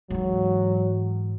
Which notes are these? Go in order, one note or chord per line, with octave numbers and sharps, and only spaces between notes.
G#2 E3 F#3